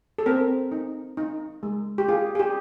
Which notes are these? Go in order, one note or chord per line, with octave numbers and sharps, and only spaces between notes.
A4
C4 A#4
D#4
D#4
G#3
G4
F4 G#4
G#4
G4